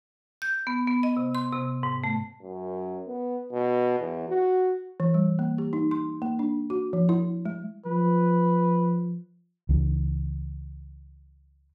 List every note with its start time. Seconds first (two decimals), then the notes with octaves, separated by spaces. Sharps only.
0.42 G6
0.67 B3
0.87 B3
1.03 D#5
1.17 C3
1.35 C6
1.52 C3
1.83 G#2
2.04 A3
2.42 F#2
3.08 B3
3.53 B2
4.00 E2
4.29 F#4
5.00 E3
5.14 G3
5.39 A#3
5.58 G4
5.73 D#4
5.91 C6
6.22 A#3
6.39 D4
6.70 F#4
6.93 F3
7.09 E4
7.46 G#3
7.86 F3 B4
9.69 C#2 E3